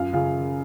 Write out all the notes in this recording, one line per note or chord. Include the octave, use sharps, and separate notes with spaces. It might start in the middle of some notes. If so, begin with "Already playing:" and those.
Already playing: F#2 F4 F5
C#3 F4 F5